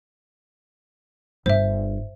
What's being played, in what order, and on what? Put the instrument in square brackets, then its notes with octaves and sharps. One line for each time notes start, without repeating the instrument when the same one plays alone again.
[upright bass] G1 [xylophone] C5 E5